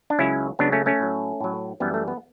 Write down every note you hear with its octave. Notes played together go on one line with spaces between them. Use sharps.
D4
C#2 C#3 F#3 C#4 E4
C#2 C#3 F#3 B3 D4
A3 C#4
A3 C#4
A2 F#3
A2 F#3
F#2 E3 G3 B3
A3
B3